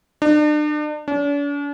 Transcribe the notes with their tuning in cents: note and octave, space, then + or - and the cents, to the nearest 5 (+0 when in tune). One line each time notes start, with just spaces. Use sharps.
D4 +40
D4 -45